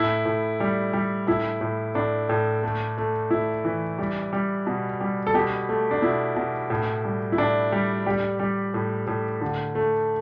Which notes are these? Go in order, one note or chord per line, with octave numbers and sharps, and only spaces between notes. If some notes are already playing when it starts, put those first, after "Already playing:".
Already playing: A2 E4
A2
G3
G3
A2 E4
A2
A2 D4
A2
A3
A3
A2 E4
E3
G3
G3
B2
G3
A4
B2 G4
A3
D4
B2 E4
B2
A2
G3
E4
A2 D4
G3
G3 G4
G3
A2
A2
D3
A3